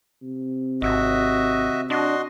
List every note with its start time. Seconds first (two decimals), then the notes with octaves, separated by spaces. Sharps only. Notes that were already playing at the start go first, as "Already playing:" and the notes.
0.22 C3
0.82 G#1 F#4 D#5 E5
1.90 D4 F#4 D#5 C6